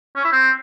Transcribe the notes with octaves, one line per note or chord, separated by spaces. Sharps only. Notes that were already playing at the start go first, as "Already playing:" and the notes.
C#4
E4
C4